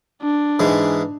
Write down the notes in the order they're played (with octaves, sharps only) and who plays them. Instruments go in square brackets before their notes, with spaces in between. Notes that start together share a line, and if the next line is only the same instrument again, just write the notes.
[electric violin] D4
[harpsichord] G#2 E3 G#3